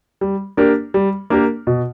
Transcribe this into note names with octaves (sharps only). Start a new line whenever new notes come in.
G3
A#3 D4 G4 A#4
G3
A#3 D4 G4 A#4
B2